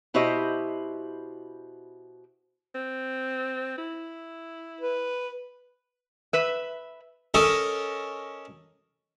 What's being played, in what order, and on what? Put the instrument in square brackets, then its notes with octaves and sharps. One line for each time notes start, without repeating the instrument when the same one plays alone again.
[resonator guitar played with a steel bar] B2 E4 F#4 G4 C5 D#5
[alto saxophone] C4
E4
[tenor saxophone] B4
[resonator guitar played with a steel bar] B4 E5
[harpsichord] C#4 A4 A#4 D#5